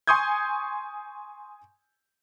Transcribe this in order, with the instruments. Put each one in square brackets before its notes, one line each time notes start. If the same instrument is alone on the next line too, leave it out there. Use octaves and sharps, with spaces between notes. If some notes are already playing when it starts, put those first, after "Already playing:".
[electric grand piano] G#5 C6 C#6 D#6 G6 G#6